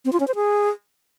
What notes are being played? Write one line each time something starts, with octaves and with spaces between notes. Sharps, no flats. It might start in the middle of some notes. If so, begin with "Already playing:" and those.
C4
F4
C#4
C5
G#4